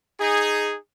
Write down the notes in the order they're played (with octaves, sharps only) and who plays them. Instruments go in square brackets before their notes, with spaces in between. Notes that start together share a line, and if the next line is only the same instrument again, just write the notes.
[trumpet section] D#4 G#4